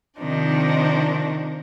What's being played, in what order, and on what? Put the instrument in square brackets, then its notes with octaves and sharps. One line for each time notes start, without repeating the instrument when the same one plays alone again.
[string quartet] C3 D#3 F3 D4 D#4